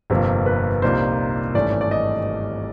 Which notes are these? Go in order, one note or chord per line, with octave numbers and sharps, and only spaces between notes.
G1 F2 C3 F3 A#3
B4
C2 A#2 F3 A#3 D#4 C5
G#1 G2 E3 A3 C#4 D5
D5
D#5